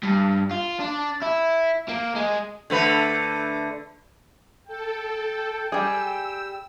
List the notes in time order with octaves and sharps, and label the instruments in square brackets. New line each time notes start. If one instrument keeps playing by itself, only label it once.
[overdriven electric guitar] G2
F4
D4
E4
A#3
G#3
[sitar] D3 A3 B4
[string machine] A4 [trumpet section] G5
[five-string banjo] G3 G#4 [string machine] E6